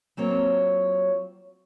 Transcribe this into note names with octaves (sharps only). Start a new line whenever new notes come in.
F#3 A#3 C4 F4 C#5